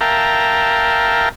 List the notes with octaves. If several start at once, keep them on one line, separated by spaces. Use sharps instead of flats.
A#4 E5 F5 G5 A5 A#5